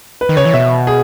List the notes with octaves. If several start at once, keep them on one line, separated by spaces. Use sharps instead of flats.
B4
D#3
C#3 C#5
E3
B2 E5
G#4